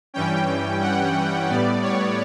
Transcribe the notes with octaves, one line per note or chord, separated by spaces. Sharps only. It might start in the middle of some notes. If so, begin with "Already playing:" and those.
G2 E3 G3 C#4 G5
F#5
A2 G3 B3 D5
C#5